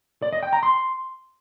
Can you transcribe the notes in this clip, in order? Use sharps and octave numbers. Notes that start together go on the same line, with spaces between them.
D5
D#5
G5
A#5
C6